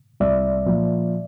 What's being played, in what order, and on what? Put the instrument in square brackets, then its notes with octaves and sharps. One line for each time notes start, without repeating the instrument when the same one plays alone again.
[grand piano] C2 [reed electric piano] D5 E5
[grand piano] A#2 F3